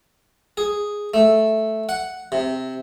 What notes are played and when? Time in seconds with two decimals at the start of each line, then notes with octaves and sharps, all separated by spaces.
0.57 G#4
1.14 A3
1.89 F#5
2.32 C3